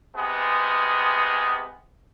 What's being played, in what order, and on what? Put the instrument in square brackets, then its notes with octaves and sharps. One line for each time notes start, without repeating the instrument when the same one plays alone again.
[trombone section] C3 G#3 B3